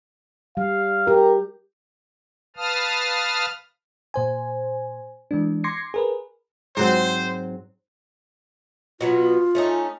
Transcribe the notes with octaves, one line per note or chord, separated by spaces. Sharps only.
G3 F5
G4 A#4
B4 F5 A5 D#6 F6
A#2 C5 G#5
E3 G#3 D4
C6 D6 G#6 A#6 C7 C#7
G#4 A#4 B4
G#2 F#3 C4 C5
B2 F#3 B3 F4
A3 C#4 D#4